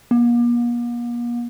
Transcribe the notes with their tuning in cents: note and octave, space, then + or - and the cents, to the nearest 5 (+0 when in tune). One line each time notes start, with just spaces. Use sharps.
A#3 +40